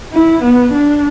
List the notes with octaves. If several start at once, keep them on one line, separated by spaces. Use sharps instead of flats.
E4
B3
D4